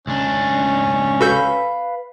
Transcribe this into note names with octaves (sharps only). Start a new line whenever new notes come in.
C#2 C#4 D4
F#4 A4 B4 F5 B5 G6